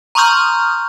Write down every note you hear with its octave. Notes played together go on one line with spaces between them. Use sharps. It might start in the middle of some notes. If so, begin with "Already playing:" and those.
A#5 C6 C#6 D#6 F6 G6